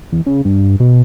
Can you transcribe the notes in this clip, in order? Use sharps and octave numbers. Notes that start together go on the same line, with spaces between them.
E2
C#3
G2
B2